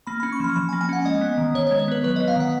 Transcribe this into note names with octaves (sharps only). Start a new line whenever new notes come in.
A#3 B5
C#4 B5
C#6
F3 B5
F3 B5
G#5
A#3
G#5
C#4 F#5
G#3 D#5
B3
D#3
D#3 C#5
C#5
G#3
C#5
B3 B4
F#3 B4
B3 D#5
F5
D#3 F#5